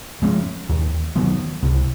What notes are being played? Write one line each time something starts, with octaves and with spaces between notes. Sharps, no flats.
F3 G#3 C#4
D#2
D#3 F#3 B3
C2